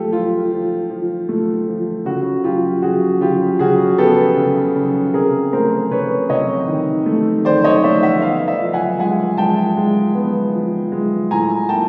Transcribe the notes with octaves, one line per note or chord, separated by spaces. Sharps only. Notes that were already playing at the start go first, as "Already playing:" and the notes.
Already playing: F3 A3 F4 G4 A4
F3 F4
F3
F3
A3
F3
C#3 F#4
F#3 F4 G4
C#3 F#4 G#4
C#3 F4 G4
C#3 F#4 G#4
B3 G4 A4
C#3
C#3
C3 G#4 A#4
A3 A#4 C5
C3 B4 C#5
C3 C#5 D#5
D#3
A3
D#3 C5 D5
C#5 D#5
A3 D5 E5
E5 F#5
B3 D#5 F5
D5 E5
F3
F#5 G#5
G#3 F#5 G#5
G#3 G5 A5
G#3
B3
F3
G#3
A2 G#5 A#5
A#3 G5 A5